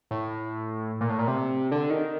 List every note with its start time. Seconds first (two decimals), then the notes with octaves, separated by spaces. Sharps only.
0.11 A2
1.01 A#2
1.09 A2
1.19 A#2
1.27 C3
1.72 D3
1.90 D#3